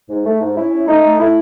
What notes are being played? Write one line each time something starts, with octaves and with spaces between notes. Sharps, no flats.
G#2
A3
G#2
C#4 E4
C#4
A3 D#4
A3
A3 E4